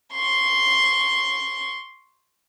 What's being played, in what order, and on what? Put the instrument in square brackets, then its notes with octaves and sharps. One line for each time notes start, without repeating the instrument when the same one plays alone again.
[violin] C6 C#6